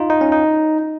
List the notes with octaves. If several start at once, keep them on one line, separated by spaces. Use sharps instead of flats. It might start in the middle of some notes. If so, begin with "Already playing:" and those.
Already playing: D#4 F4
D#4
C#4
D#4